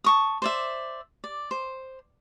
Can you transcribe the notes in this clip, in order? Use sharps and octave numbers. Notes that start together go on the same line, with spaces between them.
A5 C#6 D#6
C5 D5 E5
D5
C5